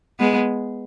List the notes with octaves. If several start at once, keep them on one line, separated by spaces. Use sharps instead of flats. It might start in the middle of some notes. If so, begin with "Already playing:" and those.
G#3 B3